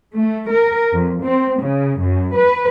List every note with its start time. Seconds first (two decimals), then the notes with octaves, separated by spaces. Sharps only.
0.14 A3
0.50 A#4
0.92 F2
1.23 C4
1.61 C#3
2.00 F#2
2.34 B4